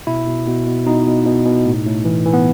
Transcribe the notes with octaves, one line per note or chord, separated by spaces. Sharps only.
B2 E4
B2
B2
B2
B2 D#4
B2
B2
B2
A2
A2
E3
E3
B3